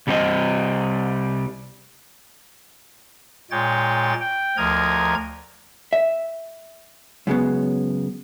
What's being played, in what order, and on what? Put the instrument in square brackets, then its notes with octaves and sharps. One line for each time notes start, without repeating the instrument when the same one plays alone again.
[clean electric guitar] C2 G3 C4 C5 D#5
[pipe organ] A#2 G#3 C#5 G5 A6
G5
D2 F3 A#4 D#5 A#5 G#6
[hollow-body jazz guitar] E5
F#2 C#3 G#3 B3